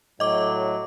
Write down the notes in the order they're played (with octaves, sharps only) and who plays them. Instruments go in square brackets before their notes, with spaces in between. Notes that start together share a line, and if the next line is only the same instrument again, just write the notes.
[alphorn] A2 [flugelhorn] F#3 [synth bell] D#5 D6